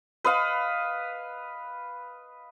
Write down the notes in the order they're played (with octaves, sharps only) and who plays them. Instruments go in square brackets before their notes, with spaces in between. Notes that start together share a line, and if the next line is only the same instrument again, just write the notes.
[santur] B4 D#5 F5